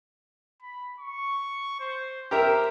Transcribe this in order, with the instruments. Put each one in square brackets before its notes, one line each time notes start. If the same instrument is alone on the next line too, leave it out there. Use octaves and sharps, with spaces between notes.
[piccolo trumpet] B5
C#6
C5
[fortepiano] G4 A#4 E5 [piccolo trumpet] C5